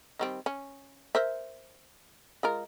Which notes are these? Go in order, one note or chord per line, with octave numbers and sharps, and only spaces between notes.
D#3 G3 C4
C#4
A#4 C5 E5
G#3 F4 A#4